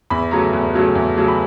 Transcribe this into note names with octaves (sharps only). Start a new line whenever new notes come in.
E2 B5
C#3 F#3 A3 A#5
E2
C#3 F#3 A3
E2
C#3 F#3 A3
B5